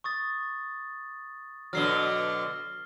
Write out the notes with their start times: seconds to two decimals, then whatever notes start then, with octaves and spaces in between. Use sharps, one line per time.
0.04 C#6 D#6 A6
1.73 B2 D3 F#3 F6 C7 G7